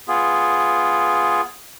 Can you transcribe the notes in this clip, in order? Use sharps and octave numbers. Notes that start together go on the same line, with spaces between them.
B3 F4 G#4